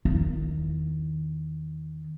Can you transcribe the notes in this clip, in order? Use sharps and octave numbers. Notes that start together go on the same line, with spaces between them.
E2 D#3